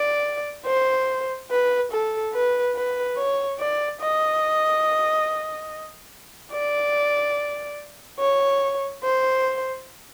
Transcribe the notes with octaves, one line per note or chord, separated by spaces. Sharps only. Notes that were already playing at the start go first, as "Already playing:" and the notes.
Already playing: D5
C5
B4
A4
B4
B4
C#5
D5
D#5
D5
C#5
C5